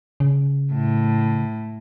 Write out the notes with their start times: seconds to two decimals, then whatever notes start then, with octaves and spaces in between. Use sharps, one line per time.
0.20 C#3
0.72 A2